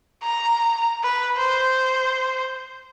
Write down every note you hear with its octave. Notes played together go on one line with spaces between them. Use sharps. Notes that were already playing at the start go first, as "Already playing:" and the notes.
A#5
B4
C5